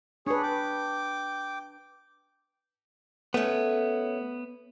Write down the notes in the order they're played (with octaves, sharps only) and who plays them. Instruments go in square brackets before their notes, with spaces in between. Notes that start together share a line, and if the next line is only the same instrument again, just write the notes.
[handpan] D4 B4 [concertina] G#4 C#5
[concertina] G5 D6
[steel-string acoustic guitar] A3 C#4 [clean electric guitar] B3